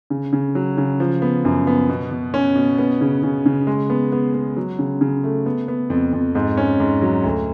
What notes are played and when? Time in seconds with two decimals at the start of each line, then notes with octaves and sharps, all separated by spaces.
0.10 C#3
0.33 C#3
0.55 F#3
0.78 C#3
1.00 F3
1.22 B3
1.45 F#2
1.67 B3
1.90 B2
2.11 B2
2.34 C#4
2.55 B2
2.78 B3
3.01 C#3
3.23 C#3
3.46 C#3
3.67 G#3
3.90 B3
4.12 B3
4.34 B3
4.57 F#3
4.79 C#3
5.01 C#3
5.24 A3
5.46 B3
5.68 B3
5.90 F2
6.13 F2
6.35 G#2
6.57 C#4
6.80 G#2
7.02 F#3
7.24 D2